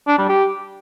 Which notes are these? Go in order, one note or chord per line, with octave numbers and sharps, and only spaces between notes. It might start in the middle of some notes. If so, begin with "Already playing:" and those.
D4
G3
G4